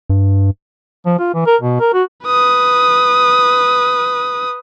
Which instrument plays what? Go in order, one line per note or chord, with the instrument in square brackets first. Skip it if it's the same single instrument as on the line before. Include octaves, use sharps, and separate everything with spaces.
[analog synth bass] G2
[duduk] F3
F4
E3
A#4
B2
A#4
F#4
[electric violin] B4 D#6